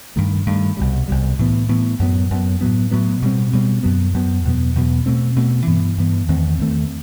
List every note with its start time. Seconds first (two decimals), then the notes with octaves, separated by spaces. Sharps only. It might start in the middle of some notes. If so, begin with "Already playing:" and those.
0.16 G2 D#3 A3
0.46 G2 D#3 A3
0.77 C2 B2 G3
1.08 C2 B2 G3
1.39 A2 E3 B3
1.69 A2 E3 B3
1.99 F#2 F#3 B3
2.30 F#2 F#3 B3
2.61 A2 F#3 B3
2.91 A2 F#3 B3
3.22 B2 G3 C4
3.53 B2 G3 C4
3.83 F#2 F#3 B3
4.14 F#2 F#3 B3
4.45 E2 B2 F#3 B3
4.75 E2 B2 F#3 B3
5.06 B2 A3 C4
5.36 B2 A3 C4
5.67 G2 E3 B3
5.98 G2 E3 B3
6.28 E2 D#3 A3 C4
6.59 E2 D#3 A3 C4